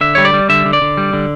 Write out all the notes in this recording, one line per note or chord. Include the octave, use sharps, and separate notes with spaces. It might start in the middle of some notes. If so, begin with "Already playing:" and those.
D3 E5
G3 C#5
D5
G3
D3 E5
D3
D5
D3
G3
D3